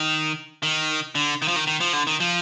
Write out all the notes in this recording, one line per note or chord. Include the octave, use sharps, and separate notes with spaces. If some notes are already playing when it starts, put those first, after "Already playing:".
Already playing: D#3
D#3
D3
D#3
F3
D#3
D#3
F3
D3
D#3
F3